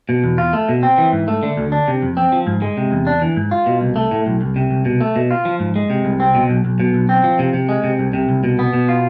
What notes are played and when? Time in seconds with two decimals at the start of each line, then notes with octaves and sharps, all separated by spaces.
0.09 B2
0.24 E2
0.38 F4
0.53 A3
0.69 B2
0.83 C4
0.98 E3
1.13 G#2
1.28 A3
1.43 D3
1.57 D2
1.72 D4
1.88 C3
2.02 F2
2.17 C4
2.32 F3
2.47 G#2
2.62 G#3
2.77 C3
2.92 E2
3.07 D4
3.22 E3
3.37 G#2
3.51 F4
3.66 B2
3.81 C2
3.96 A3
4.11 A2
4.26 B1
4.41 C2
4.56 C3
4.71 C2
4.85 B2
5.01 A3
5.16 B2
5.31 F4
5.45 F3
5.60 G#2
5.76 G#3
5.90 C3
6.05 C2
6.20 C4
6.35 B2
6.49 B1
6.65 B1
6.80 B2
6.94 B1
7.09 C4
7.24 F3
7.39 C3
7.54 C3
7.69 G#3
7.84 C3
7.99 C2
8.13 C3
8.29 C2
8.44 B2
8.59 B3
8.73 B2
8.89 F4